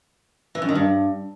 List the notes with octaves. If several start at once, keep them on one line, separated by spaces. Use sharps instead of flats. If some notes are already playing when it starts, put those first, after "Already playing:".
E3
F#2
D#3
G2